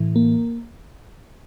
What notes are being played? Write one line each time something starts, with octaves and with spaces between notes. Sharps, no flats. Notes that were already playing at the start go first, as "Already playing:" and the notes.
Already playing: A2 E3
A#3